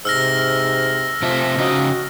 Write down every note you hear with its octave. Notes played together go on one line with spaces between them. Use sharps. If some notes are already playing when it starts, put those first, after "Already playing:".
G#2 C3 E6 F6 A#6
C3 F3 A3 E5
C#3 D#4 F#4 D#5